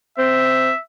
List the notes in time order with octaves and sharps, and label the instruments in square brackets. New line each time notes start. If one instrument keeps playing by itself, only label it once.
[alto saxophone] C4 [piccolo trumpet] E5